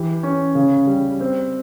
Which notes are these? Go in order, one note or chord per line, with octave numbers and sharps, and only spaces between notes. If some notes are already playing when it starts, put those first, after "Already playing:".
Already playing: E3 G4
C#4
C#3
G3
C4